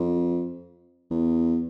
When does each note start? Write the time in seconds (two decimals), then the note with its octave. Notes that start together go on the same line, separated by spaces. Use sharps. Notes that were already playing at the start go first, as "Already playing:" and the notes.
Already playing: F2
1.11 E2